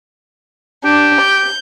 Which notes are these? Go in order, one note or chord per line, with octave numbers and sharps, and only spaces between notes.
D4 G4
G6